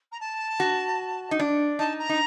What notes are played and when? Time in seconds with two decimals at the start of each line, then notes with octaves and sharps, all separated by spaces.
0.12 A#5
0.20 A5
0.60 F#4
1.31 D#4
1.40 D4
1.79 D#4 A5
1.99 A#5
2.09 D#4